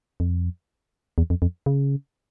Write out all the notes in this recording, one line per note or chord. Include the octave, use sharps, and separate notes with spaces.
F2
E2
F2
F2
C#3